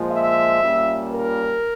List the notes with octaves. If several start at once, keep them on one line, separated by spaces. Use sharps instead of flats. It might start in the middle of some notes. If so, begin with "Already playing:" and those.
Already playing: A#2 F3 G#3
E5
A#2 G3 A#3 C#4 F4
A#4